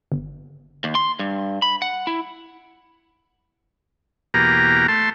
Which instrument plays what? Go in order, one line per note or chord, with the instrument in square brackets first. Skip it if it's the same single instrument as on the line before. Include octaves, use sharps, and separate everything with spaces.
[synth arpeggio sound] G1
[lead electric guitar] D#2
C6
G2
B5
F#5
E4
[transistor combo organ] E2 B2 A#3 G4 A#5
A3 A5 C6